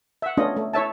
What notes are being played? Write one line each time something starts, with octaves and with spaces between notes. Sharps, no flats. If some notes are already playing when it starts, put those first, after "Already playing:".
E5 F#5
A3 B3 C#4 D4 F4 D#5
A3
E4 C#5 E5 A5